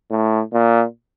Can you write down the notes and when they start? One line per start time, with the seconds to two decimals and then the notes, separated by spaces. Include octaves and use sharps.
0.11 A2
0.53 A#2